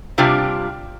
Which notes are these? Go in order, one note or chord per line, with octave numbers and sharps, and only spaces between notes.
C3 G3 D4 F4